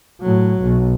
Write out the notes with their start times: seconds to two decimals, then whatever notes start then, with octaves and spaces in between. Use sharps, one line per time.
0.21 A2 F#3
0.62 B1